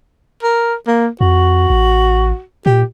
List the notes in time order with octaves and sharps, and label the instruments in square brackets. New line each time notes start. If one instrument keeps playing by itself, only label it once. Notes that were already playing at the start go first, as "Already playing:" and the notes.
[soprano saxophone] A#4
A#3
[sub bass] F2 [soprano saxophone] F#4
[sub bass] A1
[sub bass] A#2 [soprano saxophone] G4